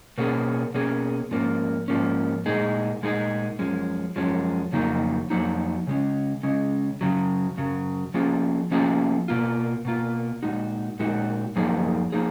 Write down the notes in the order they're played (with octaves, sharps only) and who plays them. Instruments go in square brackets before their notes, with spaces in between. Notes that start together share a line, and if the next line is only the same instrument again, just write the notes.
[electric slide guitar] B2 A#3 C#4 G#4
B2 A#3 C#4 G#4
G#2 F3 A#3 C#4
G#2 F3 A#3 C#4
A#2 G#3 D#4 G#4
A#2 G#3 D#4 G#4
F#2 F3 G#3 C#4
F#2 F3 G#3 C#4
F2 C#3 F#3 A#3 D#4
F2 C#3 F#3 A#3 D#4
C#3 G#3 C#4
C#3 G#3 C#4
F#2 C#3 F#3
F#2 C#3 F#3
F3 A#3 C#4 F4 G#4
F3 A#3 C#4 F4 G#4
B2 A#3 F4
B2 A#3 F4
A#2 G#3 D#4 F#4
A#2 G#3 D#4 F#4
F#2 F3 A#3 D#4 G#4
F3 A#3 D#4 G#4